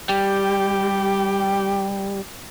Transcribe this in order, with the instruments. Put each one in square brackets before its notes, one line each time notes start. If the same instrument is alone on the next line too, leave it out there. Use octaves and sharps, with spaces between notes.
[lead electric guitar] G3 [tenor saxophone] G4